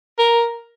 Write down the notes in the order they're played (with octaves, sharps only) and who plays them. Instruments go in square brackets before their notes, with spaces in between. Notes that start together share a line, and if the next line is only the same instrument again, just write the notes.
[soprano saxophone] A#4